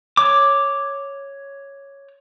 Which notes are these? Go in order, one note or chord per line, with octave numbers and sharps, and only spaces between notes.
C#5 D6